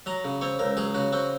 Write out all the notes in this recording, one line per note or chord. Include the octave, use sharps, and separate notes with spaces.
F#3 A#5
C#3
C4 C#5
C#2 A#4
F#3 G#4
C#3 F#4
C4 F#4